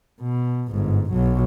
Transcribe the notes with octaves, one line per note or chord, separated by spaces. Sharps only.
B2
G1 G#2
B1 F#3